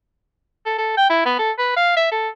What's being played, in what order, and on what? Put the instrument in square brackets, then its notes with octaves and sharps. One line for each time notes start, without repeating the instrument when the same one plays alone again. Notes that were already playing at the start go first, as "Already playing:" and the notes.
[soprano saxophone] A4
A4
G5
E4
B3
A4
B4
F5
E5
A4